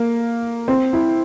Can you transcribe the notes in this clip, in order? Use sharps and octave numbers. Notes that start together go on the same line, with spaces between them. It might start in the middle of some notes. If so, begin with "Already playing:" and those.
Already playing: A#3
C4
E4